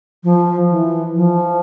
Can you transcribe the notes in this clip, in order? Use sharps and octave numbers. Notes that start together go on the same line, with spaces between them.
F3
E3
F3